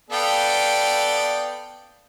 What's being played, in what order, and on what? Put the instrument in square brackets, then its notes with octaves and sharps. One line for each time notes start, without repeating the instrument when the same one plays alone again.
[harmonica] B3 A4 D5 [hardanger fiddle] F5 G5